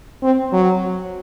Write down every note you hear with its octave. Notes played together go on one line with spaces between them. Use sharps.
C4
F#3